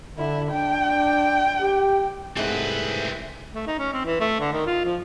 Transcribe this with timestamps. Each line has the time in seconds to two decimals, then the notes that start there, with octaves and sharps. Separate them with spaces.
0.18 D3 E4
0.52 D4 G5
1.61 G4
2.37 C2 G#2 A3 C4 G#4 B4 E5
3.55 A3
3.67 D#4
3.79 C#4
3.93 C4
4.05 E3
4.20 A3
4.40 D3
4.53 D#3
4.66 F4
4.85 F3